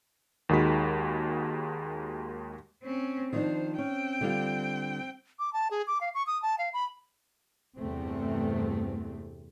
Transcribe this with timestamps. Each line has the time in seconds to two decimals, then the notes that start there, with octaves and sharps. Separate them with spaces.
0.49 D#2 D#3 G#3 F#4 B5 B6
2.83 C4 C#4
3.33 D#3 F3 D4 C5
3.78 C4 C#4 G5
4.21 D3 G3 F4
5.39 D6
5.53 A5
5.71 G#4
5.87 D6
6.01 F5
6.15 C#6
6.27 D#6
6.42 A5
6.58 F5
6.73 B5
7.78 E2 G2 C3 A3 C4